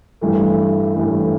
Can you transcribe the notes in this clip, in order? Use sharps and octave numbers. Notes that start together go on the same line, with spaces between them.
A1 G2 E3 A3
A1 G2 E3 A3